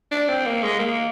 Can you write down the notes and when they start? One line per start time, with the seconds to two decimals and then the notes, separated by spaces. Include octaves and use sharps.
0.11 D4
0.29 C4
0.46 A#3
0.63 G#3
0.79 A#3